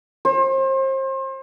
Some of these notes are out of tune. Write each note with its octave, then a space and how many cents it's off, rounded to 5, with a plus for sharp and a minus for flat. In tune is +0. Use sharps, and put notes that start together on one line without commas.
C5 +35